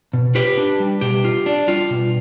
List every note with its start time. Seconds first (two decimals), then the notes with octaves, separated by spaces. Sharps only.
0.14 B2
0.35 F4 G4 B4
0.58 D4
0.80 G3
1.01 B2 G4
1.24 F4
1.46 D4
1.68 G3 F4
1.90 B2